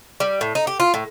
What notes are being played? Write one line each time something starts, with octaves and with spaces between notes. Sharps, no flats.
G3
A2
D#4
G4
F4
A2